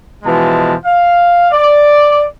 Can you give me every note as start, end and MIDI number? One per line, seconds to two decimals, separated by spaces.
0.24 0.75 47
0.24 0.75 52
0.24 0.75 53
0.24 0.75 56
0.24 0.75 81
0.86 1.48 77
1.52 2.23 74